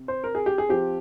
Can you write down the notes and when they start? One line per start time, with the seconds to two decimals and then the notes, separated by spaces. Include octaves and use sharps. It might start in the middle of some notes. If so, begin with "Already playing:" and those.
Already playing: C3
0.08 C5
0.24 A#4
0.35 G#4
0.46 G4
0.58 G#4
0.69 F3 C4 G4